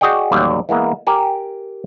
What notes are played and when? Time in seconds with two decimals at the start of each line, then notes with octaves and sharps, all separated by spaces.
0.01 F#4 G#4 D5 D#5 G5
0.32 A1 D#2 F#3 G3 D5 F#5
0.69 E3 G#3 A#3 B3
1.07 G4 A#4 G#5